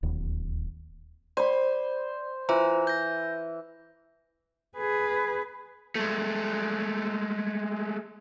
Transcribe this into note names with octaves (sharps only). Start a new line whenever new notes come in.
D1 D#2
C5 D5 B5
E3 F4 C5 A#5
G6 A#6
G#4 B4
G#3 A3